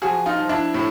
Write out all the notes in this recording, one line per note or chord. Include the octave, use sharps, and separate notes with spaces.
F3 F#4 G#4
D#4 F4
F3
D4 E4
A2